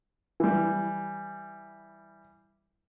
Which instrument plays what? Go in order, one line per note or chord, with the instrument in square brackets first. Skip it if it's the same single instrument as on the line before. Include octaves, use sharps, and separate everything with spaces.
[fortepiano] E3 G3